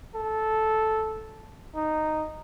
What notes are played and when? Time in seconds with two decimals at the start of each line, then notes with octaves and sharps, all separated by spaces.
0.15 A4
1.75 D#4